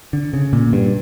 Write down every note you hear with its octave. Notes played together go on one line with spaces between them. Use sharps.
D3
C#3
A#2
G2